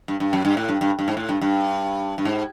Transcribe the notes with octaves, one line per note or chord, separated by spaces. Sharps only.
G2
G2
F#2
G2
A2
G2
G2
G2
G#2
A2
G2
G2
G2
G#2